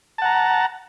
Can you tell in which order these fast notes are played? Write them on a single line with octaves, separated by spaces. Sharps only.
A5 F#5 A#5